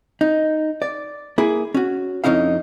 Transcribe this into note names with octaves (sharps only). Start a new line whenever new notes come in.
D#4
D5
A#3 E4 G#4
C#4 F#4
F2 C#3 C#4 D#4 E4 F5